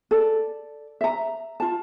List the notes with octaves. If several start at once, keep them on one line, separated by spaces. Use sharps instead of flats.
A4 D5
E5 A#5
F4 A5